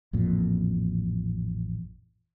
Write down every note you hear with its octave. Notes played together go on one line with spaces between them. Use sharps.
A1 F2 A#2